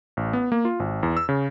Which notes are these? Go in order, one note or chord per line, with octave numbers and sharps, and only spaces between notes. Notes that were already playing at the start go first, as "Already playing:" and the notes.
A1
B3
A#3
F4
G#1
E2
E6
C#3